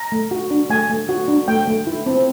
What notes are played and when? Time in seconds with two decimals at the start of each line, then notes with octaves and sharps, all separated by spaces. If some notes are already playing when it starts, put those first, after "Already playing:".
Already playing: A#5
0.12 A3
0.31 F#4
0.51 D4
0.70 A3 G#5
0.90 A3
1.09 F#4
1.28 D4
1.48 A3 G5
1.68 A3
1.87 E4
2.06 C4